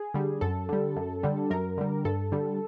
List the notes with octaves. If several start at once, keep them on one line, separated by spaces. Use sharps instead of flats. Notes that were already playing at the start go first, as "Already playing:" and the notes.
Already playing: G#4
D3 G3
F#2 A4
D3 G3
F#2
D3 G3
F#2 A#4
D3 G3
G2 A4
D3 G3